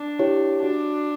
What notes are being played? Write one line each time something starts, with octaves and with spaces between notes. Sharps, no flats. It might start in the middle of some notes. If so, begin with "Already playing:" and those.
Already playing: D4
E4 G4 C#5
D4 F#4